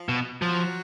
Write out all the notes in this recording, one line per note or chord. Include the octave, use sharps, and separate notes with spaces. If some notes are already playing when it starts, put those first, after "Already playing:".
Already playing: F3
B2
F3 F#3